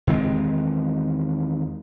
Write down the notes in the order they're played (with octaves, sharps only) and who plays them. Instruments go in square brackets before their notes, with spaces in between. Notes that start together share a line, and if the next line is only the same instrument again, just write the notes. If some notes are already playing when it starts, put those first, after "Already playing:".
[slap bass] E2 D#3 G#3 C4